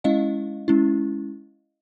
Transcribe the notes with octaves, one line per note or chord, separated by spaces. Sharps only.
G#3 C#4 E4 D#5 F5
G#3 C#4 E4